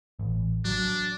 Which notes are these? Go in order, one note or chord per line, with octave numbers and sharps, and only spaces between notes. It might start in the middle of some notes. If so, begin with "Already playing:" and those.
A1
F#3 D4